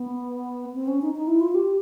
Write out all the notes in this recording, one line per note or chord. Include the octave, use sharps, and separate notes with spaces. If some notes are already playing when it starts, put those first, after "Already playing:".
Already playing: B3
C4
C#4
D#4
D#4
E4
F4
G4